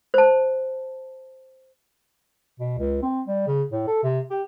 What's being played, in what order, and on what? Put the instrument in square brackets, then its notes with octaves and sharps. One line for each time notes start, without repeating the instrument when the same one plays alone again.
[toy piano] C5 A5
[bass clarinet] B2
C#2
C4
G3
C#3
A2
A4
C3
G4